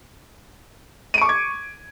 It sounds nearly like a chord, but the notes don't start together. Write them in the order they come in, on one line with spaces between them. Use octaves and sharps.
D#7 D7 C#6 D6 G#6